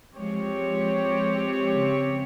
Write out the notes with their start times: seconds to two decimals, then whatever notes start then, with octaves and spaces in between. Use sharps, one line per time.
0.15 F3 G#3 C4 G4 C#5
0.94 F3 G#3
1.72 C#3